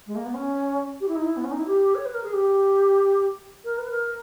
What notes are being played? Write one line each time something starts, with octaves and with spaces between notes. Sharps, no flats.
G#3
A#3
B3
C#4
G4
E4
D#4
E4
B3
C#4
D#4
E4
G4
C#5
B4
A#4
G#4
G4
A#4
B4
A#4